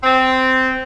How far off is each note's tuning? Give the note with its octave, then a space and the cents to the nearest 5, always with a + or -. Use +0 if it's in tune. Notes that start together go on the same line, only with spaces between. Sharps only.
C4 -10